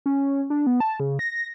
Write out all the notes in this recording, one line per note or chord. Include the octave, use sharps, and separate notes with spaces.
C#4
D4
B3
A5
C#3
A#6